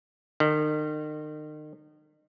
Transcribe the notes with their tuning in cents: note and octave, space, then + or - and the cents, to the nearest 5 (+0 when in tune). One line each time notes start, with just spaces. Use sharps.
D#3 -35